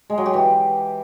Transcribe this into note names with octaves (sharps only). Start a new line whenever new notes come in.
G#3
F#3
G4
E3